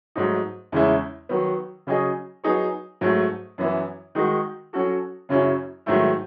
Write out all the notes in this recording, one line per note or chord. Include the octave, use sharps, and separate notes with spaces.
G#2 F#3 A3 D#4
E2 C#3 G#3 C#4 E4
D#3 F#3 B3
C#3 F#3 C#4 G#4 D#5
F#3 B3 D#4 G#4 C#5
G#2 F#3 A3
F#2 E3 B3 E4
D#3 G#3 D#4 F#4
F#3 C#4 F#4 A4
F#2 C#3 F#3 C#4 E4
G#2 D#3 F#3 A3 E4